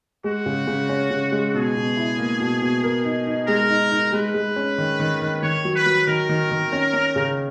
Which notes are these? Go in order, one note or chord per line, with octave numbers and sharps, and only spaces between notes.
G#3 F#4
C#3
C#3
C#4
C#3
G#3
B2 G#4
B2
E4
A#3
B2
B2
A#4
D#4
D#4
G#3 A#4
D#4
D#4
G#3 B4
G#3
C#4
D#3
D#3
D#3
D#3 C#5
F#3
B4
F#3
D#3 A#4
D#3
D#3
C#4
C#4
C#3